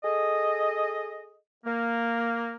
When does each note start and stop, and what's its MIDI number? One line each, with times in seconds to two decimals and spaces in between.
0.04 1.36 68
0.04 1.36 69
0.04 1.36 75
1.65 2.56 58